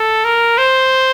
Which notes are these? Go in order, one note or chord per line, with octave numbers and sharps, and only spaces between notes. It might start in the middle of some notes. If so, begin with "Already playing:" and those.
Already playing: A4
A#4
C5